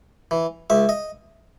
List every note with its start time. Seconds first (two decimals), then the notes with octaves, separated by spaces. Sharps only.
0.31 E3
0.70 C#2 E5
0.89 D#5